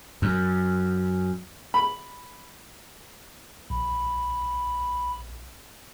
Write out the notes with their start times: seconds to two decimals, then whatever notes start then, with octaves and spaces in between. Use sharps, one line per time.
0.22 F#2
1.74 B5
3.70 A#1 B5